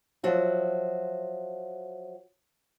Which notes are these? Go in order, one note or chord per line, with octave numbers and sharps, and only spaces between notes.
F3 F#3 F#4 E5